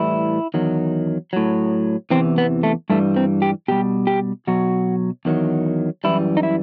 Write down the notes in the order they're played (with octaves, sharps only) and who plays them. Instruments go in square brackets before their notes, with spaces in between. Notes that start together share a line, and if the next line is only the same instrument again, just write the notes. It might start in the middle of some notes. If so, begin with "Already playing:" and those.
Already playing: [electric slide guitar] A2 E3 G3 E4
E2 D#3 F#3
A2 F#3
E2 C3 E3 C4
B3
A3
G2 E3 G3 A3
C4
G4
B2 G3 G4
G4
B2 F#3 F#4
E2 D#3 F#3
F#2 E3 G3 E4
D#4
E4